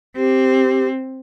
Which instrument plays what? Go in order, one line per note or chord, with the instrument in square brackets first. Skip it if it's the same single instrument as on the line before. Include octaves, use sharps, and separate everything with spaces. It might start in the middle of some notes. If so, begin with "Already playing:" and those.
[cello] C4 [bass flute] G4